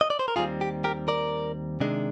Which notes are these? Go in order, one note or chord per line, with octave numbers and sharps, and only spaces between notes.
D#5
D5
C5
A#4
D#2 D#3 G3 C4 F4 G#4
G4
G4 A#4
A#4 D5
C3 D#3 G#3 D4